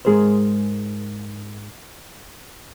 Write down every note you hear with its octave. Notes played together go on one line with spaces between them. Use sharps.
G#2 G#3 G#4 A#4 C5